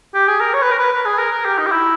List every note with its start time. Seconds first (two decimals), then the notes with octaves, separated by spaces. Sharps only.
0.14 G4
0.28 G#4
0.41 A#4
0.54 C#5
0.62 B4
0.71 A#4
0.79 B4
0.93 B4
1.05 G#4
1.19 A#4
1.32 A#4
1.45 G4
1.58 D#4
1.67 G4
1.71 E4